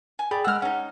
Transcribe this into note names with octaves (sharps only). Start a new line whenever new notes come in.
G#5
G#4 D5 G5 B5
G#3 F#5 E6 F6
C#4 D#4 F#5